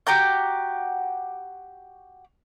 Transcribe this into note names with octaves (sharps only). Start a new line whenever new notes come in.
F#4 G4 A#5 G6